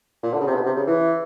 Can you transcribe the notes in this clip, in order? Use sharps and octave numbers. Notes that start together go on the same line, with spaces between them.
A#2
D3
C#3
C3
B2
C3
C#3
E3